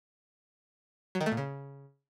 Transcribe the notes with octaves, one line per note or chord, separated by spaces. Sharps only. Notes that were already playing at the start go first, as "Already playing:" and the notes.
F#3
D#3
A3
A#2
C#3